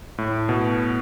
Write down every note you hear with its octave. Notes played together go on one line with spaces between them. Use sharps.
A2
B2